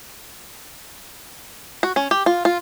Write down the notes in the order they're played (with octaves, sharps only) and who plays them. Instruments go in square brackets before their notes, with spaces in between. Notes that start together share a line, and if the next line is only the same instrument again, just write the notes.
[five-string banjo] F#4
C#4
G4
F4
F4